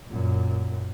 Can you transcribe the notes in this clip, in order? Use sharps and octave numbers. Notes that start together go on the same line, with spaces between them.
F#2 A#2